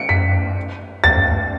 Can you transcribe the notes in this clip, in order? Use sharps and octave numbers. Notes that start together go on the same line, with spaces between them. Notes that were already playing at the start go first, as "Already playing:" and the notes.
Already playing: C#7 D7
F#2 B6
E2 A6
F#2
E2